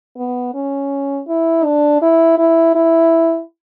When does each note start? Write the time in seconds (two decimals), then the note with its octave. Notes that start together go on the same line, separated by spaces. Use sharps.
0.16 B3
0.54 C#4
1.28 E4
1.64 D4
2.02 E4
2.38 E4
2.75 E4